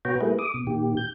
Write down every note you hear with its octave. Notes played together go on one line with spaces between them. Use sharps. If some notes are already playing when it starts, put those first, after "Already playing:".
B2 F#4 B4 C#5 G5 A#5
G3 A3 A#3 E4 G#4 B4
D6 D#6
B2
A#2 D#3 G4
G6